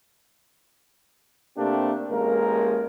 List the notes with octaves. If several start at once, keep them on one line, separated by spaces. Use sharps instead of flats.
C3 A3 A#3 C4 D4 G4
A1 G#3 A#3 A#4